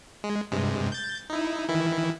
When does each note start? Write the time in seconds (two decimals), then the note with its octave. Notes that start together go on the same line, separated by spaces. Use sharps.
0.24 G#3
0.52 G2 C3 G#3
0.92 G6 A6
1.30 D#4 E4
1.68 D#3 E3 E4